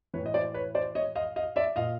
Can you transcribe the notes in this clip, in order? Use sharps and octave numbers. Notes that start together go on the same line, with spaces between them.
A2 E3 B4 C#5
D#5
C5 D5
B4 C#5
C5 D5
C#5 D#5
D#5 F5
D#5 F5
D5 E5
A#2 D#5 F5